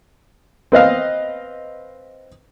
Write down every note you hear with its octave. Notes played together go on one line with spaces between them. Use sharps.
C4 B4 D#5 F5